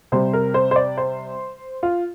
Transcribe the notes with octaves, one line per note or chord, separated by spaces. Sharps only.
C3 G3 C5
A#4
C5
C5
D5
C5
F4